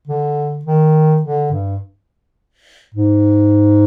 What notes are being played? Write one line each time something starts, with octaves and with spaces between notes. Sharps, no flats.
D3
D#3
D3
G2
G#2